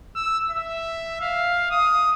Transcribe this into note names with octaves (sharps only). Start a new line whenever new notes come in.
E6
E5
F5
D#6